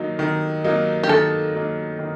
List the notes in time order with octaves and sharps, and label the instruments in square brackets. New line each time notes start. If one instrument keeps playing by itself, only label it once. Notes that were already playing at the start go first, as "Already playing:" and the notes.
Already playing: [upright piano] D#3 F#3 A#3 D#4
D#3
F#3 A#3 D#4
[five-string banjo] G4
[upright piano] D#3 [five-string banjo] A4
[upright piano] F#3 A#3 D#4
D#3